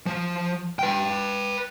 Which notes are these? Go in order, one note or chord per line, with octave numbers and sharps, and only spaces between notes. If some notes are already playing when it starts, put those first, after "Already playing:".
F3
B4 G5